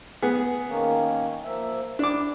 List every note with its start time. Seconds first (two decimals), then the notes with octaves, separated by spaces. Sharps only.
0.22 B3 G#4
0.69 D#3 A#3 C#4
1.45 F3 A#3 E5
1.99 D4 E4 D6